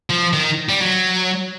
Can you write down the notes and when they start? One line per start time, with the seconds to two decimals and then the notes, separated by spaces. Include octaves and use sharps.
0.10 F3
0.33 D#3
0.69 G3
0.80 F#3